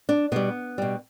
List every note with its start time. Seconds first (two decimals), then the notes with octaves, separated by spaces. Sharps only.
0.09 D4
0.32 B2 G3 B3
0.78 B2 G3